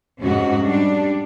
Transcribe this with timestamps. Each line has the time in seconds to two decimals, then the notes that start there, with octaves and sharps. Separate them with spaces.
0.22 F2 G#2 C3 G#3 C#4 F#4
0.67 G3 D4